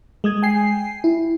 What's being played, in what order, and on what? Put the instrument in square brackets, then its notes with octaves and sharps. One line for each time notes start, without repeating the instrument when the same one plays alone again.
[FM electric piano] G#3 D#6 G#6
G5 G#5 C7
E4